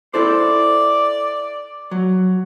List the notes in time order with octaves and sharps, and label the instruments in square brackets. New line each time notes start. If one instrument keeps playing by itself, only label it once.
[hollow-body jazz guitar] E4 A4 C5 [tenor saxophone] D5
[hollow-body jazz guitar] F#3